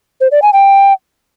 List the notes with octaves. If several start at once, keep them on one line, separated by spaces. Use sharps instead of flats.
C5
D5
G#5
G5